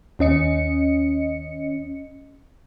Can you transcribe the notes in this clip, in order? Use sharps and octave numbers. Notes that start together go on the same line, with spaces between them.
D#2 C#4 D#5 C#7